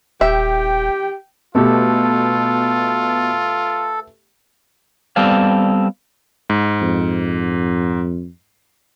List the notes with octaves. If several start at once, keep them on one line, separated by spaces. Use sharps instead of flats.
D#1 G4 E5 G5
B2 A3 B3 F4 G4 A4
G3 B3 C4 A4 D5 F5
G#2
F2